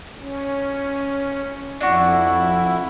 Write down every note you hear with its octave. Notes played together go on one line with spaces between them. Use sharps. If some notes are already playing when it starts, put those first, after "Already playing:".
C#4
F2 D4 E4 F#4